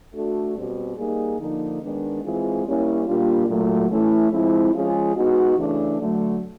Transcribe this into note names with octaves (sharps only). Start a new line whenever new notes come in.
A3 D4 F#4 A4
B2 G3 C4
G3 A#3 D#4 G#4
D3 F3 A#3 D#4
D#3 G#3 B3 D4
E3 G#3 C4 F4 G#4
G3 A#3 C#4 E4
A#2 G3 A#3 D4 F4
A#2 F#3 A3
E3 A3 C#4 E4
F3 G#3 C4 E4
F3 G#3 C#4 F4 G#4
G#3 B3 D#4 F#4
C#3 E3 A3 D4
D3 F#3 A3